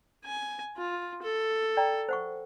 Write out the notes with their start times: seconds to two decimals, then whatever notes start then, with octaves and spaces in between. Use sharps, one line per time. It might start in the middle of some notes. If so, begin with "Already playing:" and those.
0.25 G#5
0.77 F4
1.22 A4
1.77 D5 G5 A#5
2.09 C5 F#5 C#6